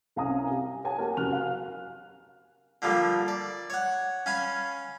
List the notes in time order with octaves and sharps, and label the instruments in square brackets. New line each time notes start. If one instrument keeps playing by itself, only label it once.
[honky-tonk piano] C2 C#4 F5 G#5 A#5 D#6
G4
C#5 F#5 G#5 A5
A#3 F#4 G4 A#4
F#1 F#4 F6 F#6 F7
F5
[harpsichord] D3 F3 G3 A#3
D5
C#5 F#5
C#4 F5 G#5 B5